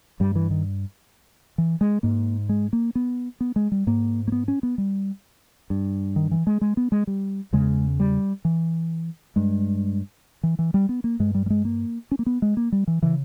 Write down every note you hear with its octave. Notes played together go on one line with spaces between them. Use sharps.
G2 G3
E3
D#3
E3
G#3
G#2 A#3
G#3
A#3
B3
B3
G#3
G3
G#2 A#3
A#3
B3
C#4
B3
G3
G2
D#3
E3
G#3
G#3
B3
G#3
G3
E2 C#3 G#3
G3
E3
G2 G#3
E3
E3
G3
B3
A#3
G2 G#3
G3
G3
G#3
A#3
C#4
A#3
B3
G#3
A#3
G3
E3
C#3 E3